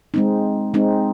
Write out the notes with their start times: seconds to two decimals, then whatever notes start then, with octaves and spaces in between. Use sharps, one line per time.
0.14 G#3 C4 D#4
0.74 G#3 C4 D#4